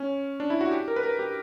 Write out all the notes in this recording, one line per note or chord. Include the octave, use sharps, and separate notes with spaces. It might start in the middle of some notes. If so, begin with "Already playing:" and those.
Already playing: C#4
D4
E4
F#4
G4
A#4
B4
A#4
G4